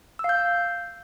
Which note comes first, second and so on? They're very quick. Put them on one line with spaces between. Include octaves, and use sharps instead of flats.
E6 F5 G6